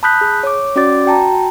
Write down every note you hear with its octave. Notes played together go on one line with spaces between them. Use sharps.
A5 B5 D#6 F#6 G6 B6
G#4
C#5 D6
C#4 F#4 D5 D6 A6
F#4 G5 A5 A#5